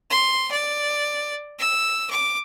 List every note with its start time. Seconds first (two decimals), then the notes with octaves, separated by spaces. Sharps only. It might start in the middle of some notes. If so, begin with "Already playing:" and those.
0.10 C6
0.51 D5
1.59 E6
2.11 D6